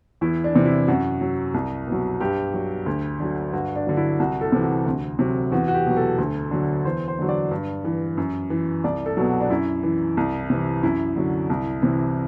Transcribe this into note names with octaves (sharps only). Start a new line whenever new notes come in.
E2 E4
D4
C3 E3
E4
F#2 F#4
F#3
C2
B2 F#3
G2 G4
F#3
D2
D3 F#3
G2 F#4
D4
D3 F#3
E4
C2 F#4
A4
C3 E3
F#4
D2
C3 F#3
E2 F#4
F#4
G4
B2 F#3
A4
D2
D3 F#3
E2 C5
C5
D3 F#3
D5
G2
E3
F#2
E3
C2 D5
A4
B2 F#3
F#4
D4
F#2 E4
E3
C2
C3 E3
F#2 E4
D3 F#3
C2
C3 E3